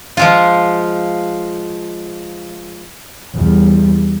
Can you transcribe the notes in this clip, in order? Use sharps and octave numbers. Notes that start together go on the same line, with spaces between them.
F3 G#3 F4
E2 G3